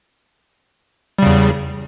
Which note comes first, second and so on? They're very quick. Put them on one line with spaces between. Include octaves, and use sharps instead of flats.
G3 C#3 E2